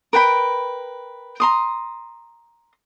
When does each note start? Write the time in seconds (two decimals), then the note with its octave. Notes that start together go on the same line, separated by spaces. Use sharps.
0.13 A#4 B4 G5 B5
1.40 A#5 C6 D#6